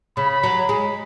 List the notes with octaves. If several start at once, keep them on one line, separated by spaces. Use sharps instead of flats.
C#3 B5
F#3
G#3